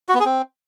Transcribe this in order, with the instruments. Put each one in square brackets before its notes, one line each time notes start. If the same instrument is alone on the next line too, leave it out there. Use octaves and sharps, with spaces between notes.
[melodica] F#4
B3
G#4
C4